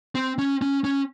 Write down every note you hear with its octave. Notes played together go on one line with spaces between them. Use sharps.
C4
C#4
C#4
C#4